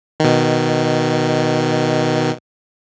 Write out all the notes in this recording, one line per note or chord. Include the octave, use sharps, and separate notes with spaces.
B2 D#3